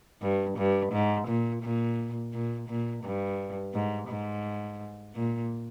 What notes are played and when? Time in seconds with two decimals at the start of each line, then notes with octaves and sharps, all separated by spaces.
0.21 G2
0.57 G2
0.92 G#2
1.27 A#2
1.62 A#2
2.33 A#2
2.68 A#2
3.03 G2
3.74 G#2
4.08 G#2
5.15 A#2